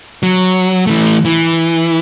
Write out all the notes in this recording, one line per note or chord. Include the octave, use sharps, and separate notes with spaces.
F#3
E3 A3
E3